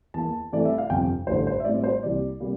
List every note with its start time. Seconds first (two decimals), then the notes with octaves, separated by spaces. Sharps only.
0.14 E2 E3 A#3 A5
0.52 G2 E3 A3 C4 D5
0.65 E5
0.78 F5
0.90 G1 F2 C3 G5
1.27 A1 G2 D3 C5
1.47 C5
1.60 E5
1.65 A2 G3 C4 D5
1.83 C5
2.03 C2 C3 E3 G3 A#3 D5
2.40 C3 G3 A#3